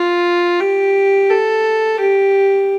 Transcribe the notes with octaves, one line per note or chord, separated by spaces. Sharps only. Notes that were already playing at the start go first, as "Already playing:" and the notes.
Already playing: F4
G4
A4
G4